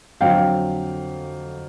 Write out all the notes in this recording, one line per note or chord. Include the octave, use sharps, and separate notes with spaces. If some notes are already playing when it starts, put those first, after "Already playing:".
F2 D3 F#3 F5 G5